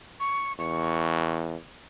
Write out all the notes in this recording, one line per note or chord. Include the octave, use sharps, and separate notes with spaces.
C#6
E2 C#6